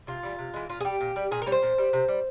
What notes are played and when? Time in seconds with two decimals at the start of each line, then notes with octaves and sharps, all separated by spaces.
0.07 C3 F4
0.23 E3 G3
0.38 C3
0.54 E3 G#3
0.69 A#2 F4
0.81 G#4
0.85 G3 G4
1.01 A#2
1.16 G3
1.31 A#2 G#4
1.42 A#4
1.46 G3 C#5
1.52 C5
1.62 A#2
1.78 G3
1.93 C3
2.08 G3